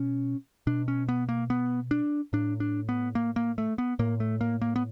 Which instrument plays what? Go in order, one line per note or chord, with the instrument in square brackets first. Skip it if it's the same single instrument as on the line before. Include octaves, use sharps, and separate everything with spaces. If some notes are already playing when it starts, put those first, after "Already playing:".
Already playing: [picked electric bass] B2 C#4
B2 D4
C#4
B3
A#3
B3
D4
A2 D4
D4
B3
A#3
A#3
A3
B3
A2 A#3
A3
A#3
A#3
B3